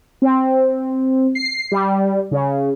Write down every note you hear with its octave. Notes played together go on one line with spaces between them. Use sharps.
C4
C7
G3
C#3